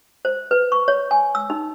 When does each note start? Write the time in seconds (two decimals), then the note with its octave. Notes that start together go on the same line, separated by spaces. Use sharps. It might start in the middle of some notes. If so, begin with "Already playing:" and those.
0.25 C5
0.51 B4
0.72 C#6
0.88 C#5
1.11 G#5
1.35 E6
1.50 D#4